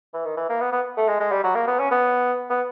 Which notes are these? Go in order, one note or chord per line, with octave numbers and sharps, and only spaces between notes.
E3
D#3
E3
A#3
B3
B3
A3
G#3
G#3
G3
F#3
A#3
B3
C#4
B3
B3